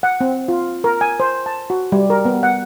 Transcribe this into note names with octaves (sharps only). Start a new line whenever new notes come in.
F#5
C4
F4
A#4
G#5
C5
A5
F#4
G3
A#4
B3
F#5